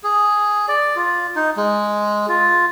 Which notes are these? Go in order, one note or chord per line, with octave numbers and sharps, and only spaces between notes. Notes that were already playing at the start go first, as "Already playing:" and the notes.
G#4
D5
F4
D#4
G#3
F4